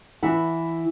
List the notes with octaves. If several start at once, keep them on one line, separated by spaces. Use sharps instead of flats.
E3 E4 F#5